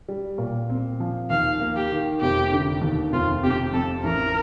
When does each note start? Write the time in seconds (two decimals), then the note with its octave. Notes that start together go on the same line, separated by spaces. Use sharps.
0.08 G3
0.38 A#2
0.70 C4
1.00 F3
1.30 D#2 F5
1.60 A#3
1.76 G4
1.91 D#3
2.21 F1 G4
2.52 D3
2.82 D#2
3.12 F1 F4
3.43 C3 G4
3.73 F2 A4
4.04 A1 A#4